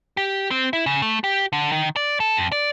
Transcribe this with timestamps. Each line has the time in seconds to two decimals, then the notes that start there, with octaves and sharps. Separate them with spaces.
0.17 G4
0.51 C4
0.73 E4
0.86 C#3
1.02 A3
1.24 G4
1.53 D3
1.72 D#3
1.96 D5
2.20 A4
2.36 F2
2.52 D5